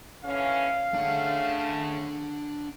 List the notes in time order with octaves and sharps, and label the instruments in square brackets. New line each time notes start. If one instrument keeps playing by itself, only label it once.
[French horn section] D3 E3 C#4 [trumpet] F5
[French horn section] C#3 A3 [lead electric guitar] D4 F#5